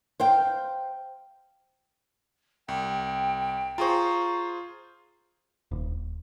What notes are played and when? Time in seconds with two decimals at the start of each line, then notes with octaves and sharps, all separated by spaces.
0.20 C5 F5 G5
2.68 C2 G5
3.78 F4 G#4 C5 A#5 C#6
5.71 D#1